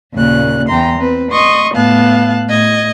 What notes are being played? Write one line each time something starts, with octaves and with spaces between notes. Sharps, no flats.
D#2 A#2 C#3 D5 F#6
E2 E3 G5 A#5 C6
C4 B4
D#5 C6 C#6 D#6
A2 B3 F5 A5 F#6
A2 D#5 G#6